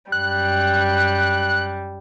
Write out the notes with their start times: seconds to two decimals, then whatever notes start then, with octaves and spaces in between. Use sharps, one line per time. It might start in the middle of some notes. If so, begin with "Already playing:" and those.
0.12 F#2 G3 F#6